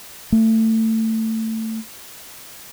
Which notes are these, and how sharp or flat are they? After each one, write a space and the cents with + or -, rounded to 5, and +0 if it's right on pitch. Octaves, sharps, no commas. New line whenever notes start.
A3 +20